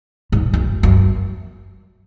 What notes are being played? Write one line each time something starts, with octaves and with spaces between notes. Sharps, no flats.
G#2
F#2
F#2